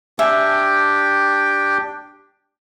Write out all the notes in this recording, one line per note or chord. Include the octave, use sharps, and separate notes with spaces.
D4 G4 E5 G5 G#5